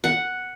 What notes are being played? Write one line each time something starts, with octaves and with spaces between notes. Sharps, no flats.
F#5